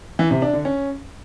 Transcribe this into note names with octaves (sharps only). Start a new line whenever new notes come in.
E3
C3
D4
D3
C#4